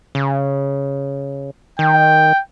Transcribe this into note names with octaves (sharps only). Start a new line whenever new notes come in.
C#3
D#3 G5